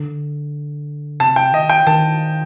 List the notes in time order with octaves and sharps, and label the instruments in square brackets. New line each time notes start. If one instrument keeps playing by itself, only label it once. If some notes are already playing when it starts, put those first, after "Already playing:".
Already playing: [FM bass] D3
[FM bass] C3 [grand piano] A5
[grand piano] G5
[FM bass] D#3 [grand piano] D#5
[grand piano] G5
[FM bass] D#3 [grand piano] A5